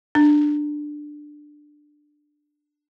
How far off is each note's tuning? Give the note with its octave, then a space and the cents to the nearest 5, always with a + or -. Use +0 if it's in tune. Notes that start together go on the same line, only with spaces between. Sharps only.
D4 +10